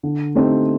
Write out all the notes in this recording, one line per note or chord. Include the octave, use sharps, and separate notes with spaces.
D3
A3 C4 D#4 G4